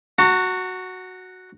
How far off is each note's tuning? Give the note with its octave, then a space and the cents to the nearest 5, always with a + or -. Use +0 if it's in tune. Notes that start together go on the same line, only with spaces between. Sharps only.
F#4 +0 A#5 -40